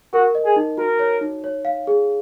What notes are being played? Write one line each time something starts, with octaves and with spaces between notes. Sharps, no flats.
F#4 A#4
D#5
G#4
D#4
F#4 A#4
C#5
D#4
C#5
F5
G#4